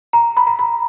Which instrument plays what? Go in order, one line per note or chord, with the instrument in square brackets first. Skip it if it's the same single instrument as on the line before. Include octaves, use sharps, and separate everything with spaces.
[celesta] A#5
B5
A#5
B5